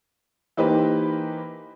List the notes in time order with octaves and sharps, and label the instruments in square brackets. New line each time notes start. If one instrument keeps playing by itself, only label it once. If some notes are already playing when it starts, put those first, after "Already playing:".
[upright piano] E3 A#3 D#4 G4 B4 C5